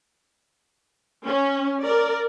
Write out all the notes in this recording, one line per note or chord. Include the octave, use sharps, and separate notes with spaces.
C#4
A#4 D5